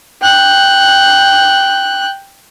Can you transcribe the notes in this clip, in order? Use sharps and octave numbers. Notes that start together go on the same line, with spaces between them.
G5 F#6